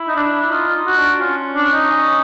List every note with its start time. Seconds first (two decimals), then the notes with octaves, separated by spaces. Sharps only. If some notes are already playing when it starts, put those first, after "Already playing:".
Already playing: E4
0.08 D#4
0.16 D4
0.51 D#4 F4
0.75 D#4
0.87 F#4
0.98 D4
1.21 C#4 F4
1.56 D4
1.73 D#4
1.91 C#4